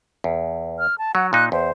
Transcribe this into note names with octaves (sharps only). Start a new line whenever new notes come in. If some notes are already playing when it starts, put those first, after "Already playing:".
E2
F6
A5
F#3 F#5
A#2 D#4 F#6
E2 C5